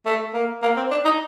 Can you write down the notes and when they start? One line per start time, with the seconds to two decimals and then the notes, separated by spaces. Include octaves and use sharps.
0.06 A3
0.34 A#3
0.62 A#3
0.77 C4
0.91 D4
1.05 D#4